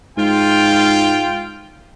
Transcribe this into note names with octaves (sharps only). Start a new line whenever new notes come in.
G#2 F4 G5